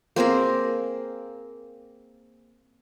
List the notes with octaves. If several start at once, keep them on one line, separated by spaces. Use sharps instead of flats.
A#3 C4 G#4 A#4